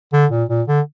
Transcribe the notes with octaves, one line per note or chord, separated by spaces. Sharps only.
D3
A#2
A#2
D3